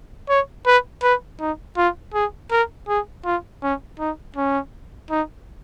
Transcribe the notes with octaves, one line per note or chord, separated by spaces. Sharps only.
C#5
B4
B4
D#4
F4
G#4
A#4
G#4
F4
C#4
D#4
C#4
D#4